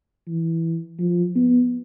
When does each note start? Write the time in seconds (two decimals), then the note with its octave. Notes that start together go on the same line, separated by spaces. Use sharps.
0.28 E3
0.99 F3
1.35 B3